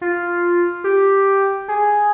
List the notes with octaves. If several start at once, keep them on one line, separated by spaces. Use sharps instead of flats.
F4
G4
G#4